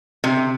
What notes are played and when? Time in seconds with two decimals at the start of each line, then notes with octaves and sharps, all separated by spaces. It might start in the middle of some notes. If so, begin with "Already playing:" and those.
0.24 C3